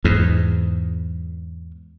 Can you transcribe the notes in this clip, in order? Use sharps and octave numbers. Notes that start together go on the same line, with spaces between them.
E2 G#2